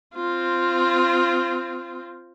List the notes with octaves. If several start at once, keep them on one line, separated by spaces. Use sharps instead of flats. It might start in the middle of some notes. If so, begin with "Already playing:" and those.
C4 F4